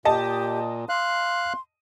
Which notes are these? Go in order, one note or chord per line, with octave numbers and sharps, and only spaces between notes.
A#2 G4 D#5 A5
F5 C6 F#6